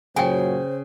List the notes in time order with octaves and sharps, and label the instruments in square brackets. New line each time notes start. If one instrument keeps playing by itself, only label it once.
[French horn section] F#2 A#2 F#3 [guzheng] C#3 [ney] C5 [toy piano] G5 G#5